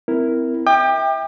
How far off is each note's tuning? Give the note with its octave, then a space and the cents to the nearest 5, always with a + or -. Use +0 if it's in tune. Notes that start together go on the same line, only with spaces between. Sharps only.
C4 -30 E4 +0 A#4 +0
E5 -25 G5 +15 D6 +40